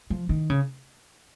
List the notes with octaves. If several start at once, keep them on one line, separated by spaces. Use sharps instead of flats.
F3
D#3
C#3